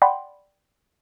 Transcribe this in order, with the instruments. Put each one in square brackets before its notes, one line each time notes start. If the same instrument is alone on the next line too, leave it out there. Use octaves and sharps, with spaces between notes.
[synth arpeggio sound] D5 F#5 G5 B5 C6